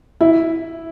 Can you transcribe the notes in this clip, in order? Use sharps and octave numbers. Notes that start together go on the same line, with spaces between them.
E4